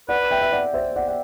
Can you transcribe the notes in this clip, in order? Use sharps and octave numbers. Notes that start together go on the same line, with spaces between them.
B4 D5 F#5
E5 G5
E5
D5 F#5
C5 E5
D5 F#5
F#5